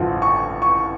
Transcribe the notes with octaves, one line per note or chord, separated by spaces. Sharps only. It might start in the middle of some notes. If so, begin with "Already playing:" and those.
Already playing: A1 G2 D3 F3
C#6
C#6